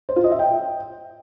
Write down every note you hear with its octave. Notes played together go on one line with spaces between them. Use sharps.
C5
F4
D#5
E5
G5